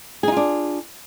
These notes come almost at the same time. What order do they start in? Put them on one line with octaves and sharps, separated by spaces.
G#4 D#4 F4 D4